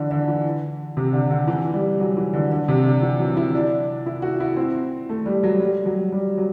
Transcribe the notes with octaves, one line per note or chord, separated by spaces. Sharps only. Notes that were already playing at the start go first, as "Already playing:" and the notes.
Already playing: D3 E3
D3
E3
C3
D3
D3
E3
G3
F#3
E3
D3
D3
C3
D3
E3
F#3
E4
D4
E4
F#4
E4
C4
A3
G3
F#3
G3
F#3
G3
F#3